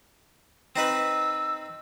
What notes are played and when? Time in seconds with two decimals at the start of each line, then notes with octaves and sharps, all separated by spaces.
0.76 C4 D#4 B4 E6